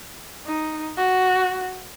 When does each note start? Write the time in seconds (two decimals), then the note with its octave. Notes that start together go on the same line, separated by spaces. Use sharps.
0.46 D#4
0.97 F#4